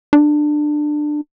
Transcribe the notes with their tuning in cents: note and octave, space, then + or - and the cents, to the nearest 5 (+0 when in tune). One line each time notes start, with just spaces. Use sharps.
D4 +20